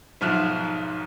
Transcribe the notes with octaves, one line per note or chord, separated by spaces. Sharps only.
B1 G#2 F3 E5 F6 F#6